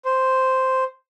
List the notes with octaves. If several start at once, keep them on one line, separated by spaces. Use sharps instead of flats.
C5